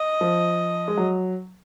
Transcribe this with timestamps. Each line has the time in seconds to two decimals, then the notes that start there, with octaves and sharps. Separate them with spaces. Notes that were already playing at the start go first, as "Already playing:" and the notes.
Already playing: D#5
0.21 F3
0.88 G#3
0.97 F#3